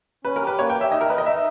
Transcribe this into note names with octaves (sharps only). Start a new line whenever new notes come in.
C#4 B4
A#4
G4
B4
A#3 C#5
G5
G4
E5
D#4 D#5
A#4
D#4 B4
D#5
D#4 E5